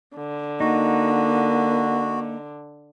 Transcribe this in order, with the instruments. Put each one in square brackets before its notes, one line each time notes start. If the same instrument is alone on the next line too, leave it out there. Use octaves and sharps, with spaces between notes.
[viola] D3
[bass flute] A#3 [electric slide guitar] D#4 [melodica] F#4